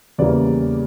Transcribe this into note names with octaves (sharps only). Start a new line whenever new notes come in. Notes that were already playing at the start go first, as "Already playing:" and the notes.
E2 C#3 E3 G3 A#3 D5